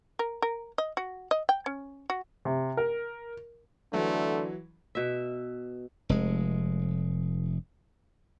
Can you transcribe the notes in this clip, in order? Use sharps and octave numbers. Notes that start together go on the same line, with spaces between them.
A#4
A#4
D#5
F#4
D#5
G5
C#4
F#4
C3
A#4
D3 E3 F#3 A3
B2 E5
F1 G#3